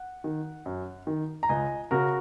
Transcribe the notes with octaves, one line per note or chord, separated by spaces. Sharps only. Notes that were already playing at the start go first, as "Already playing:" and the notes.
Already playing: F#5
D#3
F#2
D#3
A#5
C#2 D#5 G#5
C#3 F#4 A#4